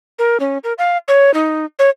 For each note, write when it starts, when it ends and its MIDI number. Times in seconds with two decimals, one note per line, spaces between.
0.19 0.37 70
0.40 0.58 61
0.64 0.73 70
0.78 0.97 77
1.08 1.33 73
1.34 1.65 63
1.79 1.90 73